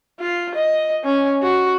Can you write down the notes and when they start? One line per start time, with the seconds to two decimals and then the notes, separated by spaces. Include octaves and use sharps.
0.20 F4
0.55 D#5
1.04 C#4
1.42 F#4